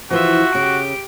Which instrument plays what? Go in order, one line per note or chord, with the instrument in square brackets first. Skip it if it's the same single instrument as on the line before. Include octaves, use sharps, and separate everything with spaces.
[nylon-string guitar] E3 F3 [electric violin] F4 E5 [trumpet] F#4
[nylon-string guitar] C#3 [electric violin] G4 D7